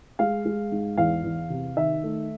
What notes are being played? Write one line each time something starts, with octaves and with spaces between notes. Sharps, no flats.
G#3 F5
G#3
G#2
E2 F5
E2
C3
D#3 E5
A3